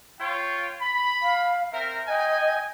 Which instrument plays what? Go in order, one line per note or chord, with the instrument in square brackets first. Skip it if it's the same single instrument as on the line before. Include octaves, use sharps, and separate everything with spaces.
[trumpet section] F4 C#5 G5
B5
[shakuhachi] F5
[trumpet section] C4 A#4 [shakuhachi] E5
[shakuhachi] D#5 [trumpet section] G5 G#5